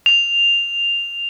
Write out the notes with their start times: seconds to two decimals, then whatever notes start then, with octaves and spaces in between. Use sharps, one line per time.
0.06 F7